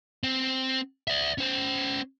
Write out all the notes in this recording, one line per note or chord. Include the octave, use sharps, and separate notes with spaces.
C4
D5 E5
C#4 C5